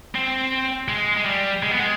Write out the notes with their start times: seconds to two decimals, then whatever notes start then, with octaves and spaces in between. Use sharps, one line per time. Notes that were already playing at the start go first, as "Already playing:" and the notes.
0.15 C4
0.88 G#3
1.17 G#3
1.26 G3
1.63 G#3
1.71 B3
1.80 G#3